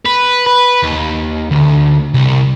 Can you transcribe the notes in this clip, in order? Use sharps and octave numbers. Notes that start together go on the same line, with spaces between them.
B4
B4
D#2
D2
C2